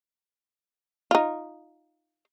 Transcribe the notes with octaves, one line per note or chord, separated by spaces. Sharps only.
D#4 F4